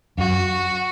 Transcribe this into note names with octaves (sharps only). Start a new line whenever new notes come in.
F#2 F#4